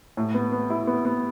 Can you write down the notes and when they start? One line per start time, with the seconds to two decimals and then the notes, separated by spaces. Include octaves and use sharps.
0.17 A2
0.34 B3
0.52 B3
0.70 E4
0.87 B3
1.05 B3